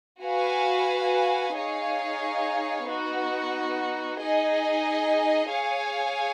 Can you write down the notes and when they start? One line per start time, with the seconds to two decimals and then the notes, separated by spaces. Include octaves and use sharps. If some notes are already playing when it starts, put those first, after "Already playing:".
0.23 F#4 B4 F5 G#5
1.56 D#4 G#4 C#5 F5
2.87 B3 D#4 F#4
4.18 D#4 G#4 D#5 G#5
5.50 G#4 C#5 F5 G#5